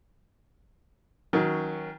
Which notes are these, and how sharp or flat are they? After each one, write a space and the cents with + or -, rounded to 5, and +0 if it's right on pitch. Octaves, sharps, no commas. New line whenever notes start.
D#3 +25 F#3 +0 C#4 +0